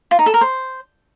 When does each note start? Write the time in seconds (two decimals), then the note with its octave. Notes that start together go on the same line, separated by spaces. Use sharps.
0.11 F4
0.19 D#4
0.26 A4
0.34 A#4
0.41 C5